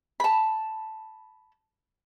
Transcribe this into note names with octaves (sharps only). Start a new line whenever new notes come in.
A5 B5